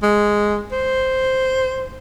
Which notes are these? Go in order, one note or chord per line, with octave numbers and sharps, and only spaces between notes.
G#3
C5